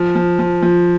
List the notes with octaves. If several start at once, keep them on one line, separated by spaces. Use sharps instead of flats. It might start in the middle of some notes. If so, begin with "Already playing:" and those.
Already playing: F3
F3
F3
F3